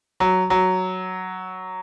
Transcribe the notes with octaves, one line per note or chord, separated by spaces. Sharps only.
F#3
F#3